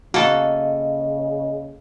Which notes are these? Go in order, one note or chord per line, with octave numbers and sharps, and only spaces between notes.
C#3 A#3 F#4 A4 D#5 A5